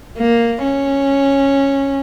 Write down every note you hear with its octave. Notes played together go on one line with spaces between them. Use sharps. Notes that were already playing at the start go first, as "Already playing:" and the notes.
A#3
C#4